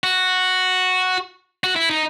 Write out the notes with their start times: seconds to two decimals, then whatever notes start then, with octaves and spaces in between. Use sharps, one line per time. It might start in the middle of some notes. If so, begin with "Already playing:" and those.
0.04 F#4
1.64 F#4
1.76 E4
1.89 D#4